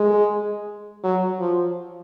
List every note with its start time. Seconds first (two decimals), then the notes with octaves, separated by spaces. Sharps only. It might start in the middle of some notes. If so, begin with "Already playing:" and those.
Already playing: G#3
1.03 F#3
1.40 F3